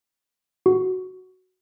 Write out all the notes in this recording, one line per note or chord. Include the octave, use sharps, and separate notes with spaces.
F#4